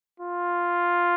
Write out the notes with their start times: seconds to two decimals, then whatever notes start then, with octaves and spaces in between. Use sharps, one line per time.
0.20 F4